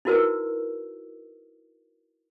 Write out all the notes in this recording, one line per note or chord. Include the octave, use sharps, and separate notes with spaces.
D#4 E4 F#4 A#4 B4 E6